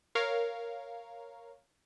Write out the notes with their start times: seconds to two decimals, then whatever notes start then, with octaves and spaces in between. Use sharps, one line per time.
0.15 A#4 C#5 F5